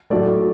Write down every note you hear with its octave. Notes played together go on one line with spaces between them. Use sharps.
A2 F#3 A3 D5